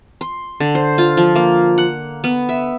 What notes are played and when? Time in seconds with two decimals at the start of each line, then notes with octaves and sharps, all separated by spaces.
0.21 C6
0.60 D3
0.75 C5
0.98 F4
1.17 F3
1.35 A#3
1.78 F#5
2.24 B3
2.49 E5